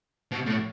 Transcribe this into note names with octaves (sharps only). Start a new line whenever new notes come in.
B2
A2